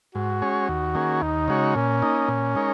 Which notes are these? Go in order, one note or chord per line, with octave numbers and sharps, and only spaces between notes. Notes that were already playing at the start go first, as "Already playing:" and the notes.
G#2 F#4
G#3 C#4 G#4 C#5
D#2
D#3 A#3 C#4 G#4
D#2 D#4
C#3 G#3 F#4 C#5
A#2 C#4
A#3 D#4
A#2
G#3 D#4 A#4 C#5